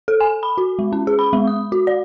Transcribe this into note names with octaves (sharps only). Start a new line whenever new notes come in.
A4
G#5
B5
F#4
G#3
C#4
G#4
B5
G#3
D#6
F#4
D5